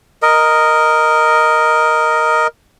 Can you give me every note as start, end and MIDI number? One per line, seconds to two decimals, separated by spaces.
0.23 2.47 70
0.23 2.47 75